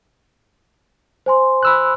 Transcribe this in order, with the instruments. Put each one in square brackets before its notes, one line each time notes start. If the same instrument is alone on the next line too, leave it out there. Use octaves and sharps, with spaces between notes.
[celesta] C5 G#5 C6
[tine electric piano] B5 E6 F#6